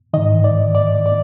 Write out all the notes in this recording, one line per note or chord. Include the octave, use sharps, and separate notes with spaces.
G#2 D#3 D#5
D5
D5
D5